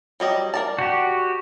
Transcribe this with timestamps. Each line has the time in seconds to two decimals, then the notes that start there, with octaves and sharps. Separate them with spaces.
0.20 F#3 G3 D#5
0.54 A#4 D5 A5
0.79 F#4 G4